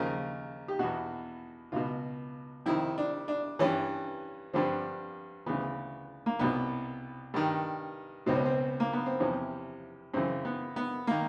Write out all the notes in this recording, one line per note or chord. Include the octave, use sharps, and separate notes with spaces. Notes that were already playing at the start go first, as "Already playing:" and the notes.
Already playing: D#2 C#3 F3 A#4
G4
E2 B2 F#4
C#2 B2 F4
F2 C3 D#3 E4
D4
D4
G2 E3 C#4
G2 D3 F3 C4
D2 C#3 E3 B3
A#3
C2 B2 B3
G2 D#3
C#2 B2 C4
C#4
C4
A#3
B3
C4
E2 C3 F3 C#4
F#2 C#3 E3 C4
B3
B3
D#3 A#3